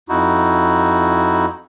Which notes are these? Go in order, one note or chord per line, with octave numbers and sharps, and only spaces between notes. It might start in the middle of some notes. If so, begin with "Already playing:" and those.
F2 D#4 E4 F#4